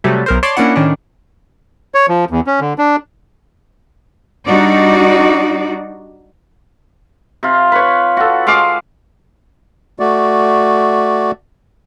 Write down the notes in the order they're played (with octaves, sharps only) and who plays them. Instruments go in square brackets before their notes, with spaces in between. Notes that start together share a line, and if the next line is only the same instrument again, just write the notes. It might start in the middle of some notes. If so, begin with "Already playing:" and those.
[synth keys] C3 F#3 G3 A3
B1 A#4 C5
C#5 D5 A5 C6
A#3 C#4 D4 E4 F#5
A2 D#3 C#4 D4
[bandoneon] C#5
F3
E2
C#4
D3
D4
[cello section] G3 D4 D#4 F#4 D5
[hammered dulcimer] C3 F4
B4 C#5
F#4 A4
G#3 F5 D6
[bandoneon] A3 F#4 D5